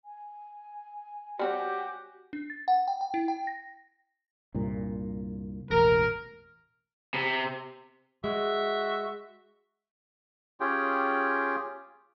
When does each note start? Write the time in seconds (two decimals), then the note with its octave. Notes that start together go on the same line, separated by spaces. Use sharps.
0.05 G#5
1.39 G3 C4 F#4 G4 C#5
2.33 D4
2.50 A6
2.68 F#5
2.88 G5
3.01 G5
3.14 E4
3.28 G5
3.47 A#6
4.54 C2 G2 A#2
5.70 E1 A1 A#4
7.14 C3
8.24 G#3 F#4 E5
10.60 C#4 F4 G4 G#4 G5